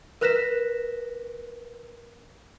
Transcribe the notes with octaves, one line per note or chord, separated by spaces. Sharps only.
A#4 B4 F#6 A#6 B6 E7